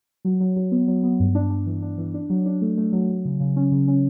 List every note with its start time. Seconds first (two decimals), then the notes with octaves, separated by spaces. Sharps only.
0.25 F#3
0.41 F#3
0.56 F#3
0.72 B3
0.88 F#3
1.04 B3
1.20 G2
1.35 D4
1.50 D4
1.66 E3
1.83 D4
1.98 E3
2.14 D4
2.30 F#3
2.46 D4
2.62 A3
2.77 A3
2.93 F#3
3.09 F#3
3.25 C#3
3.40 C#3
3.56 C#4
3.71 C#3
3.88 C#4